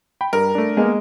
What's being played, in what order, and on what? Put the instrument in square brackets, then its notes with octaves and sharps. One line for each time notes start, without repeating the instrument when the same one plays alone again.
[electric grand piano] G5 B5
[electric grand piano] G2 [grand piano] A#4
[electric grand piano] A3 D4
[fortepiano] G#3 [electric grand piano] A#3 B3